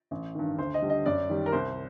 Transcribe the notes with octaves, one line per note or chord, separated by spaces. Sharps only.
A1
G2 D#3
D2 C5
D#5
D3 G3
D#5
F#2 D5
D#3 G3
A#4
C2 C5